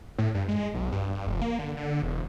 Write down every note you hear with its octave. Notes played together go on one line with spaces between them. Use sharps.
A2
G2
G#3
B1
G2
F1
A#3
D3
D3
E1